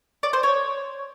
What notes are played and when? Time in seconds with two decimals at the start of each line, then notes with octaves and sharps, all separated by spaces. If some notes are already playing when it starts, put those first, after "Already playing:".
0.23 D5
0.33 C5
0.43 C#5